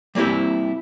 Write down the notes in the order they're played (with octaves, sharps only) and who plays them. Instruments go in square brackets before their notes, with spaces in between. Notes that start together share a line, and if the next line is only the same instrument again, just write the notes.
[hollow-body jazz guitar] G3 A#3 C4 E4 G4